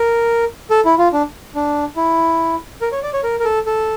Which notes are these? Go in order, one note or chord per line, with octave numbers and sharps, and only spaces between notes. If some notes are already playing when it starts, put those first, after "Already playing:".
Already playing: A#4
A4
E4
F4
D4
D4
E4
A#4
C#5
D5
C#5
A#4
A#4
A4
A4